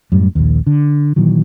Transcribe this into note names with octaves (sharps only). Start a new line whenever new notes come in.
F#2 A2 G3
A#1 D#2
D3
A#2 D#3 E3 F#3